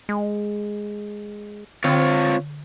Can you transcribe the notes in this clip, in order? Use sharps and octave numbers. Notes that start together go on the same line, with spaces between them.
G#3
D3 C4 F4 C#5